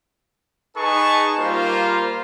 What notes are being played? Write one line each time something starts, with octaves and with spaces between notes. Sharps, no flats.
D#4 G#4 B4 A5 C#6
G3 A#3 F4 A#4 C5